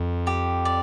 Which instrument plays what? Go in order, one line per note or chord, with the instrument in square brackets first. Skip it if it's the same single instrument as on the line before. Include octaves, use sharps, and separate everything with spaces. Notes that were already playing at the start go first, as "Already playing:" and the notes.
Already playing: [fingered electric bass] F2
[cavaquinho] G4
D5